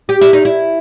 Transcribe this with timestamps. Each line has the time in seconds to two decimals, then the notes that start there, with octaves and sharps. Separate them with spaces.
0.09 G4
0.21 E4
0.33 D#4
0.45 E4